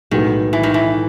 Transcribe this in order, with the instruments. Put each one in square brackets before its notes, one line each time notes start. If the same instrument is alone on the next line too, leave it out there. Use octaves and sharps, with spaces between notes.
[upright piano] B1 A2 G#3 B3 F#4 [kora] D#3
[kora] E3
D#3
E3